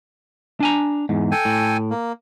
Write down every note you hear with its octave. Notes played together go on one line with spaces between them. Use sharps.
D4 G#5 A#5
E2 G#2
A4 G5 G#5
A2
A#3